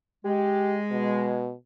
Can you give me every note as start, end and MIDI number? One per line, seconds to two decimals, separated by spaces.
0.25 1.51 56
0.25 0.77 67
0.91 1.53 47